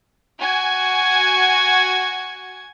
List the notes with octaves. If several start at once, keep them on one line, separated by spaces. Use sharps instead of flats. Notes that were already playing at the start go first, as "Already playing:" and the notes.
F#4 G#5 G#6